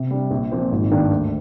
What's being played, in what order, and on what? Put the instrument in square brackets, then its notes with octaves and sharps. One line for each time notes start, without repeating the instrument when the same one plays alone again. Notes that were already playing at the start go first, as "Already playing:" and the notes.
Already playing: [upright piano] C3
G3 D4
A#1
A#2 F3 C4
G#1
G2 D#3 A#3 D4
D2